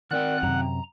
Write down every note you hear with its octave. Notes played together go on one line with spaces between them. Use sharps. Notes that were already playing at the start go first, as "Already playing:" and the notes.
D#3 C4 A#4 D5 F#5 G5 F#6
F#2 C3 A#5